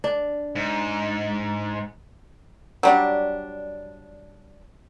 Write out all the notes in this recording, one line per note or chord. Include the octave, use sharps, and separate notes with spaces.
D4
G#2
F#3 G3 D4